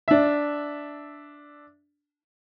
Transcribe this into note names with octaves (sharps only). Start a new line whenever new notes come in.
D4 E5